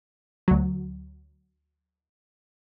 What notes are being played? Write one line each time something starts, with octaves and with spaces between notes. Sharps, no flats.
D2 F#3